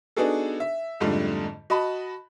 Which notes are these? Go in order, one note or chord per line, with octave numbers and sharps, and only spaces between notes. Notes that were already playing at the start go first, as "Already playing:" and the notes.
B3 D4 D#4 F#4 G#4 A4
E5
F2 G#2 D3 G3 A3
F#4 D#5 A5 B5